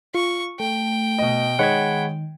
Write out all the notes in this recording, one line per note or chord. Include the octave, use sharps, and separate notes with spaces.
F4 C#6
A3 G5
B2 D#5
D#3 G#3 C#5 D#5 F#5 B5 G#6